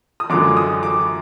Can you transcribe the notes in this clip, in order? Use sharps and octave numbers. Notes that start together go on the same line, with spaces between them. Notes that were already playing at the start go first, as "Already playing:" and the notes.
D#6
F#2 D3 F3 G#3 D6
D#6
D6